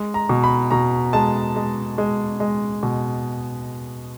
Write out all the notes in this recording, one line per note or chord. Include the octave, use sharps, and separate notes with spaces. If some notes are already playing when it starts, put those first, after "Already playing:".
Already playing: G#3
A#5
B2
B5
B2 A#5
G#3 A5
G#3
G#3
G#3
B2